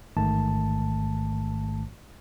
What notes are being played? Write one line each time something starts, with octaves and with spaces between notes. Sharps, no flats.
A1 G#2 D#3 A3 A5